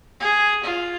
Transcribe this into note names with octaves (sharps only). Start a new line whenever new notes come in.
G#4
F4